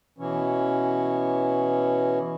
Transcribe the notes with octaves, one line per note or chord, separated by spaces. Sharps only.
B2 E3 C#4